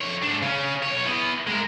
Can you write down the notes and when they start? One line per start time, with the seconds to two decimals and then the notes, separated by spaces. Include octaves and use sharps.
0.01 F2 C#5
0.22 G#2 D4
0.42 C#3 C#4
0.82 B1 C#5
1.05 E3 B3
1.47 G#3 A#4